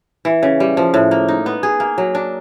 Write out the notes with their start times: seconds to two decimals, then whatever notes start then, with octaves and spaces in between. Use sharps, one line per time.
0.25 E3
0.43 C#3
0.60 G3
0.77 F3
0.94 A2
1.11 A#3
1.28 D#4
1.46 B3
1.63 G#4
1.80 A#3
1.98 F#3
2.15 D4